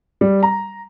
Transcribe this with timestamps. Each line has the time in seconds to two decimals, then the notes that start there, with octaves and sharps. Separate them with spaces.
0.21 G3
0.43 A#5